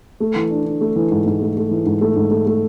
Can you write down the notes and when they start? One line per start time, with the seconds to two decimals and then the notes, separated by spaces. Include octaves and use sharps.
0.20 A3
0.36 E3
0.51 D4
0.66 D4
0.81 A3
0.96 E3
1.12 G#2
1.26 G#2
1.41 A3
1.57 A3
1.71 E3
1.86 G#2
2.01 A3
2.16 G#2
2.31 A3
2.47 A3